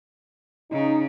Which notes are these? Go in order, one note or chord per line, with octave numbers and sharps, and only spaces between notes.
C#3 D#4